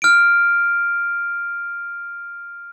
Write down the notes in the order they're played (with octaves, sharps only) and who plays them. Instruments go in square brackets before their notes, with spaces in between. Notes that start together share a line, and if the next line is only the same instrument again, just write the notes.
[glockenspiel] F6 D7